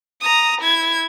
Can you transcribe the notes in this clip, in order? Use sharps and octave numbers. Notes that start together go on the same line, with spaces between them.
A#5 D#6
E4 G#6